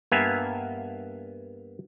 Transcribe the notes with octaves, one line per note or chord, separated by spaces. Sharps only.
G2 A#3 B3 E5 F5 G#5